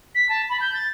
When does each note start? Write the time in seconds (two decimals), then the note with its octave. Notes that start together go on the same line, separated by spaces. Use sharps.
0.15 B6
0.29 A5
0.49 B5
0.61 G6
0.74 A6